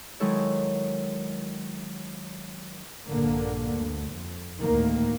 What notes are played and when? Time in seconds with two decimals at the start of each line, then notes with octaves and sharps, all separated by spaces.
0.20 D#3 F#3 G#3 E4 A4 C#5
3.09 A#1 G2 D3 A#3
3.75 D2
4.13 F2
4.61 D2 A2 D#3 A#3